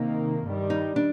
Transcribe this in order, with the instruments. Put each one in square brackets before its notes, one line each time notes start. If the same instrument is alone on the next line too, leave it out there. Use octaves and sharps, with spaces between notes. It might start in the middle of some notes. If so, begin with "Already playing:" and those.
Already playing: [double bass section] C3 D#3 A#3 [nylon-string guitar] D#4
[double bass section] G2 D#3 G3
[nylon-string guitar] D#4
D4